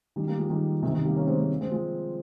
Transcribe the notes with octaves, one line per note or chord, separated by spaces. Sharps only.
D#3 G3
G3 A#3
F3 G#3
D#3 G3
C3 D#3
C3 D#3
G3 A#3
A#3 C#4
G#3 C4
G#3 C4
G#3 C4
F3 G#3